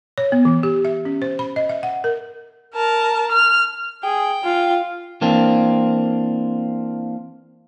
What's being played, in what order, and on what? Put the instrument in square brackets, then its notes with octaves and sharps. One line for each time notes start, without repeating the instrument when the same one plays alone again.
[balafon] C#5
B3
E3
G4
E5
C#4
C5
B5
D#5
E5
F#5
A#4
[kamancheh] A#4 A5
F6
[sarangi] G#4 [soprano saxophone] G5
[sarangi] F4
[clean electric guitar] E3 A#3 C4 D4